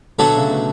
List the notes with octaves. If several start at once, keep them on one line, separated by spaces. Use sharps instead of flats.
B2 D3 F#3 A3 D4 F#4 A4
C#3
B2